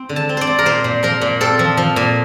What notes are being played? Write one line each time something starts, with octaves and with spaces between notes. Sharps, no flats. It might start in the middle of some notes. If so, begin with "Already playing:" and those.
Already playing: C4
D3
A5
C4
C5 D5
C4
A#4
A#2 C5
A#2
F3 A#4
A#2
C4 A4
F3
F3
A#2